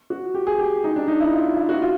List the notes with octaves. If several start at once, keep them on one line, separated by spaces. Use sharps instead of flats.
F#4
G4
G#4
G4
D#4
D4
D#4
E4
F4
E4
F#4
F4